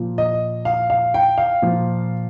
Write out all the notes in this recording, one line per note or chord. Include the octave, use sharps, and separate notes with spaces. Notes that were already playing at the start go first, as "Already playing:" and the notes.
Already playing: A#2 F3
D#5
F5
F5
G5
F5
A#2 F3